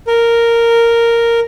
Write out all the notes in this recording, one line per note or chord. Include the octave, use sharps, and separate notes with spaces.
A#4